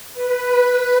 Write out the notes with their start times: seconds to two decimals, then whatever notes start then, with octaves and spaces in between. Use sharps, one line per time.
0.13 B4